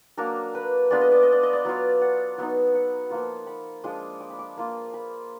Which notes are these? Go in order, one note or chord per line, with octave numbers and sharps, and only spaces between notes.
F#3 A#3 D4 A#4
B4
G#3 B3 D4 F4 D5
D#5
D5
D#5
D5
D#5
D5
F#3 B3 F4
F#5
F#3 B3 D#4
F#5
F3 A#3 F4
B5
F3 G#3 D4 F4 D#6
D6
B5
D6
A#3 F4
B5